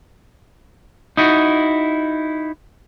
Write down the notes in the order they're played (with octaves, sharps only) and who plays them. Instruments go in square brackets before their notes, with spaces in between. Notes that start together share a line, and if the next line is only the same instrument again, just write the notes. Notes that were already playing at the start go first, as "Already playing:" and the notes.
[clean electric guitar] D#4 E4 F#4